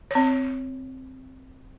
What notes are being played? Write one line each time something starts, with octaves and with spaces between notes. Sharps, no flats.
C4 C#5